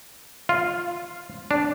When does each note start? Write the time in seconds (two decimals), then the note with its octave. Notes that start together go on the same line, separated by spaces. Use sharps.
0.49 F4
1.51 D4